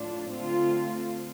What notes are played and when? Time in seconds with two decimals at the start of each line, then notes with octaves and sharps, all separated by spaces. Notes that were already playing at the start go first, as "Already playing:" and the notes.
Already playing: A2 F3 D4 F4
0.30 D3 A3 C4 F4